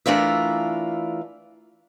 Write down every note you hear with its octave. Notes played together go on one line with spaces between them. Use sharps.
E3 A3 D4 F4 A#4 E5